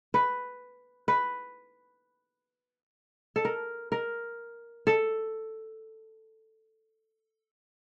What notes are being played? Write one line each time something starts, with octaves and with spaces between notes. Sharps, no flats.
B4
B4
A4
A#4
A#4
A4